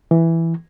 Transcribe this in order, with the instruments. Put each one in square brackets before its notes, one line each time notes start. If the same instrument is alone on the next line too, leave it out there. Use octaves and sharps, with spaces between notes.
[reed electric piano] E3